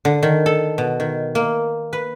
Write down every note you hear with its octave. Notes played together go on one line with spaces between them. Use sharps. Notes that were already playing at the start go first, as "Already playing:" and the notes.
D3
D#3
A4
B2
D#3
A#3
B4